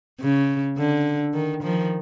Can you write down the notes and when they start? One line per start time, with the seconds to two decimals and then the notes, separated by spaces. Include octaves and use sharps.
0.21 C#3
0.78 D3
1.34 D#3
1.63 D#3 F3